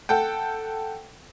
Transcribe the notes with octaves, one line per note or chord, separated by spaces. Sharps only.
A4 F#5 G5